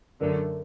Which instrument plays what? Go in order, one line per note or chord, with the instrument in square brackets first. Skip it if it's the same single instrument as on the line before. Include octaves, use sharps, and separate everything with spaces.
[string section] F#2 D3 A3 [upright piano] A#4